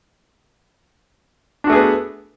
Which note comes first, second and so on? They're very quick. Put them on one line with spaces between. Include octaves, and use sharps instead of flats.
D4 F#4 A3 G#4 B3